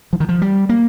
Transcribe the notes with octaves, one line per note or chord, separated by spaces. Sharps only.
F3
D#3
F3
G3
A#3